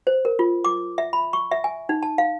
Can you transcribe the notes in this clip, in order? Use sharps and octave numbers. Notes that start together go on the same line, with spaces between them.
C5
A#4
F4
D6
E5
B5
C#6
E5
G#5
D#4
A5
F5